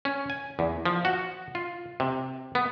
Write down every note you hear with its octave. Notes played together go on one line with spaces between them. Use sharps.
C#4
G#5
E2
F3
F#4
F4
C3
B3